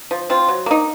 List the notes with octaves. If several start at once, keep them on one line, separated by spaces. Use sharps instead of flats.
F3
C4 F4
F#3
A#3 D#4